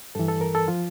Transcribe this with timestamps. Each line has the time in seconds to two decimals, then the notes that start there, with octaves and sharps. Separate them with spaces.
0.15 G2 E3 A4
0.28 A4
0.41 A#4
0.55 A4
0.68 F3 F4